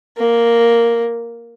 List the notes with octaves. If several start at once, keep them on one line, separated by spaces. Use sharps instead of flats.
A#3